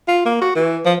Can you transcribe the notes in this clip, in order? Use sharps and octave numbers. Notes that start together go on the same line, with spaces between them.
F4
A#3
F#4
E3
F3